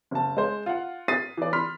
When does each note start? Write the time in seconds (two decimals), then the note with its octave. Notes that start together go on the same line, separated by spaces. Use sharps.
0.11 F#1 A5
0.37 G#3 C5
0.66 F4 F5 F#5
1.08 D#6 A6 B6 C7 D#7
1.37 E3 D5
1.53 B5 C6 F6 B6